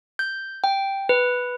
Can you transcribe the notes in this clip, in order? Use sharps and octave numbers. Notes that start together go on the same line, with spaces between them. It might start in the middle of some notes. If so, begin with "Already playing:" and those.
G6
G5
B4